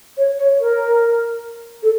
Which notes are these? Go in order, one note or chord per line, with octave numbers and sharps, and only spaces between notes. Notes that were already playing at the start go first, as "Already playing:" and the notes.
C#5
C#5
A#4
A4